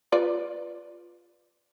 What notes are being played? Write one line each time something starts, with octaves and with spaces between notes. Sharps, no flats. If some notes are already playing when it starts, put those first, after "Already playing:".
F4 B4 D5